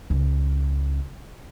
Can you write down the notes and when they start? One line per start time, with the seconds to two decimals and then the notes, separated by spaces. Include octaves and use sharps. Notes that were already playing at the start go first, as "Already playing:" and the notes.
0.10 C#2